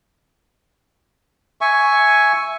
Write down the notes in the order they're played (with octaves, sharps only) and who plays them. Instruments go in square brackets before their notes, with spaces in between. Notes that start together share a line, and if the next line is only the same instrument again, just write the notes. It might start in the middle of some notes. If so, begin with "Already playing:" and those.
[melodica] E5 G#5 C#6